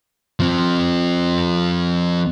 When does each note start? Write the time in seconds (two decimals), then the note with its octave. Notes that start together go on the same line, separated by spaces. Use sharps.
0.40 F3 C4